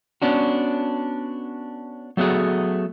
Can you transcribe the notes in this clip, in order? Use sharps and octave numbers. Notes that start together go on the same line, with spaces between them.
B3 C#4 D4 F#4
F#3 A3 B3 F#4 G#4